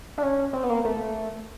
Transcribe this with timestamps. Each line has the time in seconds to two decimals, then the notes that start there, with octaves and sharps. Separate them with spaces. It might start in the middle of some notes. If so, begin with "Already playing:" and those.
0.18 D4
0.23 C#4
0.53 C4
0.63 B3
0.69 A#3
0.85 A3